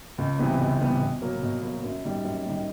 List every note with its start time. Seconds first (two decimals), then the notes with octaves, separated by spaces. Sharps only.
0.18 C#2
0.39 C3 E3 G3 B3
0.59 C#2
0.80 C3 E3 G3 B3
1.01 B2
1.21 F#3 A#3
1.43 B2
1.62 F#3 A#3
1.84 F#2
2.05 D#3 G3
2.24 F#2
2.46 D#3 G3